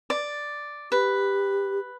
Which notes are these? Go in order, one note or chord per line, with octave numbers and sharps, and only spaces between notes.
D5
G4 B4